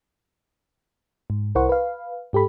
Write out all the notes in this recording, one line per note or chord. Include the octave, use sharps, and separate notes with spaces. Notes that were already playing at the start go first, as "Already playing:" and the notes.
G#2
C2 E4 A#4 C5 F#5 C#6
B4 F5
G#2 G4 A4 B5